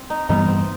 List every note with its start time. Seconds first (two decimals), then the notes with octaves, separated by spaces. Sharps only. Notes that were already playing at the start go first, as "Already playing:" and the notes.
Already playing: C4
0.10 D#4
0.29 G2 E3 G3 B3 D#4
0.48 C4